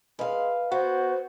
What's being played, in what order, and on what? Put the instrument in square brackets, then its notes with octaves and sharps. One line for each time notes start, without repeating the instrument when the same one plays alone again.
[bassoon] G#3 [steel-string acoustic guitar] B4 F5
[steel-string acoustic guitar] B3 [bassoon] F#4 [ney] C5